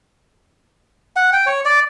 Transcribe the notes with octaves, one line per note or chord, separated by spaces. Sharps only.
F#5
G5
C#5
D5